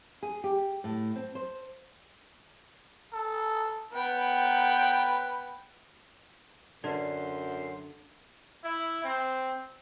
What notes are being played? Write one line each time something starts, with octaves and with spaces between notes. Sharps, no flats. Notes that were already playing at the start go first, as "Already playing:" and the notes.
G#4
G4
A2
C4
C5
A4
B3 B4 G5
F#2 D3 B4 D5 C6
E4
C4